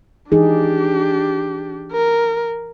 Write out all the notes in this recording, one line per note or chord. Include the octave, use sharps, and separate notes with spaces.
E3 D4 D#4 G4 G#4
A#4